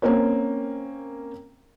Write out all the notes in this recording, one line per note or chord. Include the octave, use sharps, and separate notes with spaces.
A#3 C4 C#4 A#4 C#5